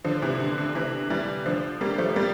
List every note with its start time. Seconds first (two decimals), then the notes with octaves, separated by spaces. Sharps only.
0.04 D3 F3
0.22 C3 E3
0.40 D3
0.58 D3
0.75 C3 E3
1.10 E3 G3
1.46 D3 F3
1.81 G3 A#3
1.98 F3 A3
2.16 G3 A#3